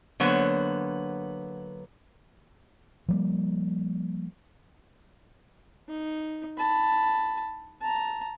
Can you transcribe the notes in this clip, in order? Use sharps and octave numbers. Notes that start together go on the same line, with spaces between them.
D3 F#3 A#3 B3 C5 C#5
F3 G3 A#3
D#4
A5 B5
A5 A#5